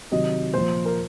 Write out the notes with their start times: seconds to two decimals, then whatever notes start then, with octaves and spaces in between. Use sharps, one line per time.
0.11 C3 D#3 F#3 D#5
0.53 A#2 F3 C5
0.85 A#4